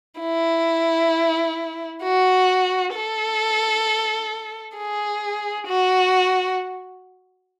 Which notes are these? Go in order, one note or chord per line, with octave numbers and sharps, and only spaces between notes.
E4
F#4
A4
G#4
F#4